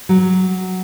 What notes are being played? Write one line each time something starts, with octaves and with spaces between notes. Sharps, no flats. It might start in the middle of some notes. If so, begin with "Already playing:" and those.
F#3